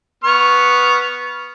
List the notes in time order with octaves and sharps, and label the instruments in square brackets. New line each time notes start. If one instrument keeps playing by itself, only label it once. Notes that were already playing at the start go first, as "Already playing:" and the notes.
[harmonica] B3 C#6 F6